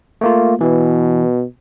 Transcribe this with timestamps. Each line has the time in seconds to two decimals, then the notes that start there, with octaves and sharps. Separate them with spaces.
0.21 A3 A#3 F4
0.61 B2 E3